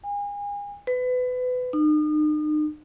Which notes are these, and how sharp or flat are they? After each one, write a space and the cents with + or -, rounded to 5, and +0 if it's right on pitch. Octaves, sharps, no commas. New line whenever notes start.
G#5 -35
B4 +25
D#4 -40